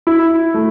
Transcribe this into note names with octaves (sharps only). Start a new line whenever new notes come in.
E4
A3